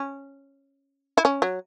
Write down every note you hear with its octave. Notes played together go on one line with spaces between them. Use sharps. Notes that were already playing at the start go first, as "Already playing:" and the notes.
Already playing: C#4
E4
C#4
F#3